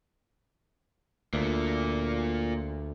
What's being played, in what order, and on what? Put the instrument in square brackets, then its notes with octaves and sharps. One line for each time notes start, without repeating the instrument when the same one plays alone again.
[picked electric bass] D2 [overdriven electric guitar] A#3 F4